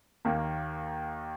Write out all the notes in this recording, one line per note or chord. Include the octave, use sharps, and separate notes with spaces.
D#2 D#3 A#3